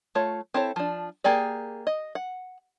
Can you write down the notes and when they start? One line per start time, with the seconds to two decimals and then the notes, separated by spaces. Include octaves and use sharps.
0.15 A3 F4 C#5
0.54 C4 E4 A4 C#5
0.76 F3 D4
1.24 A#3 G4 G#4 D5
1.87 D#5
2.15 F#5